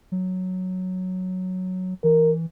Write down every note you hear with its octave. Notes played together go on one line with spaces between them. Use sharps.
F#3
E3 A#4